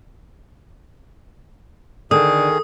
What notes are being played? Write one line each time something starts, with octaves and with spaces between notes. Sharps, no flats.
D3 D#3 G#4 D#6